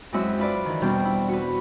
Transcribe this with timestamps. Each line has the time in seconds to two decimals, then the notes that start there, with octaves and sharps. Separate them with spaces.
0.12 F#2 G#3 C4 E4 F#4 E5
0.38 D4 F4 B4 D5
0.65 D#3 E3
0.81 E2 B2 G3 C4 D4 G5
1.05 E4
1.29 F#4 B4